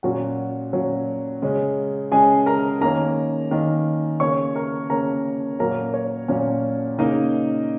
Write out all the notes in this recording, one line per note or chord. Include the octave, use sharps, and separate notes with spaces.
A#2 F#3 C#4 F#4 F#5
A#2 F#3 C#4
C#3 G#3 C#4
C#3 G#3 C#4 G#4 G#5
A#4 A#5
D#3 A#3 C#4 A#4 A#5
D#3 A#3 C#4
C#3 A#3 C#4 C#5 C#6
A#4 A#5
C#3 A#3 C#4 A#4 A#5
A#2 F#3 A#3 C#4 A#4 A#5
C#5
A#2 F#3 A#3 C#4
C#3 A#3 C#4 D#4 D#5